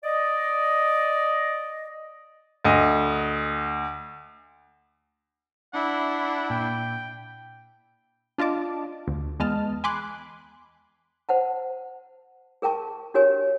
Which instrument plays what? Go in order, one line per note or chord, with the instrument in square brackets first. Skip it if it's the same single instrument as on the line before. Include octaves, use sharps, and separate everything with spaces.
[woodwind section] D5 D#5
[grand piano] D2 D#5
[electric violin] D4 E4 [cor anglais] F#5
[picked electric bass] A#2 [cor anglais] G5
[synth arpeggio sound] D4 F4 D#5 A5 D6
D2
E2 G#3 B3 D#5 A5 F6
G#5 B5 C6 D6 F#6
[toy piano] C5 F#5 A5
G#4 A#4 G5 A5 C#6
D4 F#4 G4 A#4 C#5 G#5